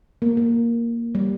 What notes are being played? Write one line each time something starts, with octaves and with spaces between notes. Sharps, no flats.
A#3
A#3
G3